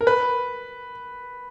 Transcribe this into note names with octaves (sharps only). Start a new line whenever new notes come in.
A#4
B4